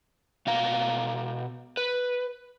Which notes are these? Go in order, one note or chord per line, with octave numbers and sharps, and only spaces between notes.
B2 F5 A#5
B4